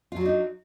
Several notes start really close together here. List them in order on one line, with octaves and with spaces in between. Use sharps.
F4 F#3 D4 D#4